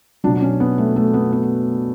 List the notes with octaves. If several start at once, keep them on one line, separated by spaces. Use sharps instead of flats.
B2 F#3 D4
C#4
B3
A3
A3
B3
B3